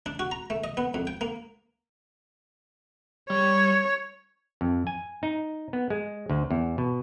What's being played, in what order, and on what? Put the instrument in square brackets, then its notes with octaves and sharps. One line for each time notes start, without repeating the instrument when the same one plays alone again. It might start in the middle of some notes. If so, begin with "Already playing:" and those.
[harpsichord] D4
F#4
A#5
A3
D#5
B3
F2
G5
A#3
[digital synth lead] G3 [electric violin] C#5
[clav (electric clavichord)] F2
G#5
D#4
B3
G#3
D2
E2
B2